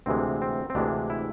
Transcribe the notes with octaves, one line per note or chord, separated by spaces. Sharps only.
D2 C3 E3 G#3 C4
C4
C4
D2 C3 E3 G#3 D4
E4